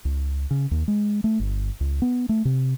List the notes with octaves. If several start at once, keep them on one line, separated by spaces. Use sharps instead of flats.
C#2
C#3
D#2
G#3
A3
G1
C#2
B3
A3
C3